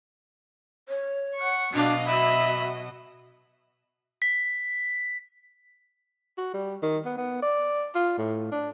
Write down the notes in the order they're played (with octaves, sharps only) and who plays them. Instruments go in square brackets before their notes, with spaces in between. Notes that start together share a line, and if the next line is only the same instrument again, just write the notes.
[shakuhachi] C#5
[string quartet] F#5 C#6
[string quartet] B2 F#3 D#5 [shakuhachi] D4 [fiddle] F5
[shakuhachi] E5 [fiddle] B5 E6
[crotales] B6
[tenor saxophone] F#4
G3
D#3
B3
B3
D5
F4
A2
D4